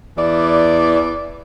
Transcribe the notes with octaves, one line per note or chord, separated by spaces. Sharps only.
E2 E3 D5